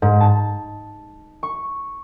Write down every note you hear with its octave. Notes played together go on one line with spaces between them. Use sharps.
G#2
A5
C#6